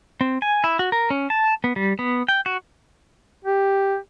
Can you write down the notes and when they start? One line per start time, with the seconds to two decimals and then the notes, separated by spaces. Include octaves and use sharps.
0.21 C4
0.42 G#5
0.64 E4
0.79 F#4
0.92 A#4
1.10 C#4
1.30 A5
1.64 B3
1.76 G3
1.99 B3
2.28 G5
2.46 F#4
3.44 G4